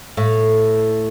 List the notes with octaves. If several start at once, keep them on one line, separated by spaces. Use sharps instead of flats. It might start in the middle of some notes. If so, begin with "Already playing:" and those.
A2